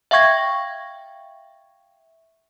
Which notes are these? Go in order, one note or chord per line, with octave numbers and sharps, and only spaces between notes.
E5 F5 G5 C#6 G#6 A#6